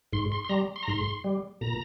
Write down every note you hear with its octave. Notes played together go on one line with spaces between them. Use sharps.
G#2 C6
C6
C6
G3 A#5
C6
A#5
G#2 C6
G3
A#2 A#5